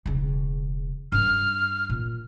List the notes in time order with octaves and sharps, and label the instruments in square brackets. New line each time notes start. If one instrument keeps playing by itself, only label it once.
[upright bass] E1 C#3
[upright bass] G2 C4 [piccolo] F6
[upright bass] A#2